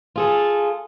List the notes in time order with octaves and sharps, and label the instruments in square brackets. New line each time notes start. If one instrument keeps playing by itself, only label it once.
[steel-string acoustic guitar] F4 G#4 A4